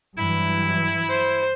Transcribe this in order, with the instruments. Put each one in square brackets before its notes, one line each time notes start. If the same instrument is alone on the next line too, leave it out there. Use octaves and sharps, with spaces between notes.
[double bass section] G2 E3 F#3 [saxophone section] E4
[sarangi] C5